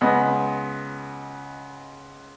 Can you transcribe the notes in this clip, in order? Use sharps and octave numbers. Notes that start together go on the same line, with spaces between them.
C#2 B3 D#5